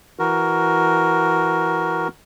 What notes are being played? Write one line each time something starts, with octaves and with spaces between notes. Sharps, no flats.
E3 F#4 A#4